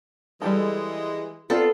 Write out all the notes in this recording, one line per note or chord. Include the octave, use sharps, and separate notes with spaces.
E3 G3 G#3 G4 A4
B3 C4 F4 A4 D5